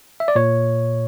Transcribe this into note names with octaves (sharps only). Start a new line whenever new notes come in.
E5
D5
A#2 C#5